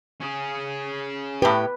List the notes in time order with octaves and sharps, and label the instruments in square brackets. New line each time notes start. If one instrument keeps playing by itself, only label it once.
[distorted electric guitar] C#4 G#4
[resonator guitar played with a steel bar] A2 G4 [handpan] B4